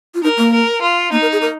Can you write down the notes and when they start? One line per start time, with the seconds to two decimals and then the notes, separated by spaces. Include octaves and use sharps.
0.14 F4
0.23 D#4 A#4
0.38 A#3
0.53 A#4
0.82 F4
1.12 A#3 D#4
1.22 A#4
1.32 G#4
1.42 A#4